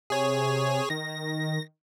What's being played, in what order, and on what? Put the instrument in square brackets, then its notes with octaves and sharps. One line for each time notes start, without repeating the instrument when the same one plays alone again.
[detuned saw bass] C3 [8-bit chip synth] G#4 C#5
[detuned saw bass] D#3 [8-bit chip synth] A#6